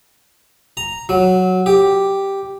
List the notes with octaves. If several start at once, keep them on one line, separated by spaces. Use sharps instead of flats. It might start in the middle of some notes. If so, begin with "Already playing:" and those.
A#5
F#3
G4